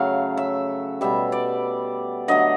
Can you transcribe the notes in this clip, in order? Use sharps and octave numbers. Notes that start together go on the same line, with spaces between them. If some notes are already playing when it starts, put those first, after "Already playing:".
Already playing: C#3 F#3 A3 F5
E5
B2 G3 E5
D5
D3 F#3 A3 D#5